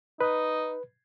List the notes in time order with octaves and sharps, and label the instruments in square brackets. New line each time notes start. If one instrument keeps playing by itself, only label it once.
[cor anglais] D#4 [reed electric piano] B4